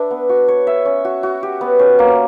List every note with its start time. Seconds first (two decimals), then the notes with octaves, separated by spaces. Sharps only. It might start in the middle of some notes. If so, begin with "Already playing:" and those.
Already playing: D4 B4 E5
0.11 B3
0.29 F#4
0.48 C#5
0.67 E5
0.85 C#4
1.05 F#4
1.23 F#4
1.43 G4
1.61 B3
1.79 C#4
1.99 A#3